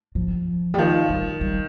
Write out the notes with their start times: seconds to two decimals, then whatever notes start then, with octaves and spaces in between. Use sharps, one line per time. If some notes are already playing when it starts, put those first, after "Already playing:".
0.15 F3
0.74 G3
0.78 D#3 F3
1.09 G3
1.41 G3